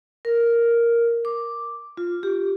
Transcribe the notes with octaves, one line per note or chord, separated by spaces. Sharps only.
A#4
D6
F4
G4